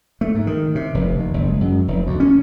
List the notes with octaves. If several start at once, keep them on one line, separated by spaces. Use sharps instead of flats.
A3
G#2
D#3
C3
F1
D#2
F#1
G#3
F#2
F1
D2
C#4